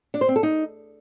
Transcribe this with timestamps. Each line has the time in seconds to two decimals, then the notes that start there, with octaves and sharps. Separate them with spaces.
0.14 D4
0.21 C5
0.28 C4
0.36 A4
0.43 D#4